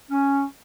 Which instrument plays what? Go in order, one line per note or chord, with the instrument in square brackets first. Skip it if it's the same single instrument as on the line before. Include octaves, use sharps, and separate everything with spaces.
[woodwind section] C#4